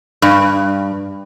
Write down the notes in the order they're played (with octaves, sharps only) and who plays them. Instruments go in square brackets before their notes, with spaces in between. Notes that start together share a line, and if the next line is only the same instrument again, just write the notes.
[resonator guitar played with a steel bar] G2